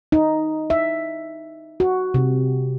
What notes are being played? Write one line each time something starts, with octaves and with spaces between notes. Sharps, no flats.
D#4
E5
F#4
C3